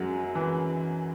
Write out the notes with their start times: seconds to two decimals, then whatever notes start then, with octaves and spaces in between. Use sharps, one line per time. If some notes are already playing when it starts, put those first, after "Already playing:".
Already playing: F#2 F#3 G#3
0.35 E3